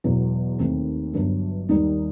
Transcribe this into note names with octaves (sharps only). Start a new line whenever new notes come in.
E1 E2 B2 F#3
D#2 D#3 A3 C4
G1 G2 F#3
D#2 D#3 G3 D#4